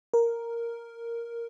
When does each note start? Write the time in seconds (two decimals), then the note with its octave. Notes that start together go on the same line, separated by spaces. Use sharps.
0.14 A#4